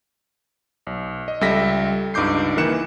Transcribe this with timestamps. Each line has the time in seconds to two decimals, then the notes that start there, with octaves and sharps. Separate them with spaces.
0.87 B1
1.28 D#5
1.41 C#2 G3 A4 E5 A#6 B6
2.14 C#2 G2 D#4 D6 G6 C7
2.57 D#3 E3 A#3 F#6 C#7 E7